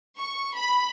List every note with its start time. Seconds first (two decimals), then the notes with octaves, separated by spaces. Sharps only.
0.17 C#6
0.55 B5